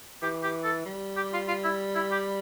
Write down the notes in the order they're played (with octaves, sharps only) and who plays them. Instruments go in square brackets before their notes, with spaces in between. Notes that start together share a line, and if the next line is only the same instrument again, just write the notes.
[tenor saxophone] E3 [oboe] G4
[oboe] G4
A4
[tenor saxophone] G3
[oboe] G4
F4
F4
E4
E4
G4